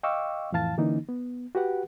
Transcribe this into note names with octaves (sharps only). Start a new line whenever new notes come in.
D#5 F5 G5 C#6 D6 E6
F2 A2 E3 F5 A5 A6
D3 E3 A#3 C#4 D#4
B3
F#4 G4 B4 F#5